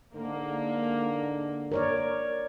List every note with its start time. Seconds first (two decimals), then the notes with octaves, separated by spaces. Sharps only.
0.14 G#2 D3 A#3
1.72 A#4 C#5 D5